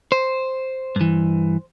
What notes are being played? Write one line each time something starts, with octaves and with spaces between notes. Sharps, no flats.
C5
G2 E3